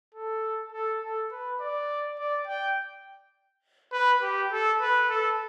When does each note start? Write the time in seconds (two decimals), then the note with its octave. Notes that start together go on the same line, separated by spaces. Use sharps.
0.14 A4
0.73 A4
1.02 A4
1.31 B4
1.60 D5
2.19 D5
2.47 G5
3.92 B4
4.22 G4
4.52 A4
4.81 B4
5.10 A4